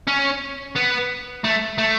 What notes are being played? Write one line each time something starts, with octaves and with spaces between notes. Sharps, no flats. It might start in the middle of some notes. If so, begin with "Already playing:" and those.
C#4
B3
A3
A3